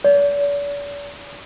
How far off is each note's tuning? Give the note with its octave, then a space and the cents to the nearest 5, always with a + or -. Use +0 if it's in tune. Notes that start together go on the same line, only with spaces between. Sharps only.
D5 -45